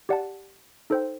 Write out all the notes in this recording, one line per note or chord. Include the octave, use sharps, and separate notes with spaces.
G4 D5 F#5 A5
D#4 A4 C5 G5